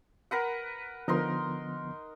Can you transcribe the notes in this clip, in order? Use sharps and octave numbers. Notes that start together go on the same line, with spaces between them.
A#4 B4 F#5
D3 F3 B3 D#4 A#4 C6